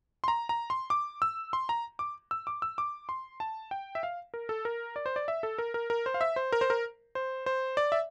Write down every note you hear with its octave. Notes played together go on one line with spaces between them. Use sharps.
C6
A#5
A#5
C6
D6
E6
C6
A#5
D6
E6
D6
E6
D6
C6
A5
G5
E5
F5
A#4
A4
A#4
D5
C5
D5
E5
A4
A#4
A#4
A#4
C5
F5
E5
C5
A#4
C5
A#4
C5
C5
D5
E5